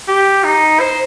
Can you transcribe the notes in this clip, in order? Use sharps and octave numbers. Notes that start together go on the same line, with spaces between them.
G4
D#4
C5